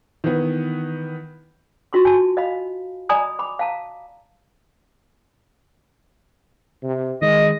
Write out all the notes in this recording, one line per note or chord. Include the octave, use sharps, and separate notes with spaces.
D#3 E3 B3
F4 F#4 C6 C#6
G#5 A5
D#5 F5 B5
D5 D#5 G#5 A#5 B5 D#6
B5 D6
F5 A5 A#5
C3
D#3 G#3 D#5